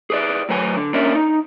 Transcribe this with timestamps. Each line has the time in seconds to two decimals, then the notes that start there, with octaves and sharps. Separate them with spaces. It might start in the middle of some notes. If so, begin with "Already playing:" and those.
0.10 G#4 B4 D5
0.49 A2 F#3 B4 G#5
0.77 D3
0.94 A#3 C#4 D4 A#4 D5 E5
1.15 D#4